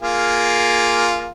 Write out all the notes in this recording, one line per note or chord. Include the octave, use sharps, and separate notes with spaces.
A#3 F4 G#4